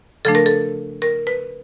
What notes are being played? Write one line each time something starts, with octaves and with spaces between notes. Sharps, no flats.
C#3 F3 A3 D4 A4
A#4
A4
A#4
B4